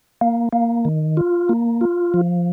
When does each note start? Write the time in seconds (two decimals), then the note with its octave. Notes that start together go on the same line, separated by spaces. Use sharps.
0.21 A#3
0.53 A#3
0.85 D#3
1.17 F4
1.49 A#3
1.81 F4
2.14 F3